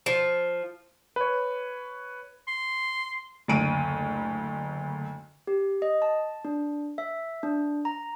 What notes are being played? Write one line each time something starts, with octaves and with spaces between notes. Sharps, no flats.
F3
B4 C#5
C6
F#1 D2 D7 D#7
G4
D#5
A5
D4
E5
D4
A#5